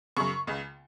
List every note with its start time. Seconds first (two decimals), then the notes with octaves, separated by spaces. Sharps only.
0.17 F#2 C#3 C#6
0.47 C#2 C#3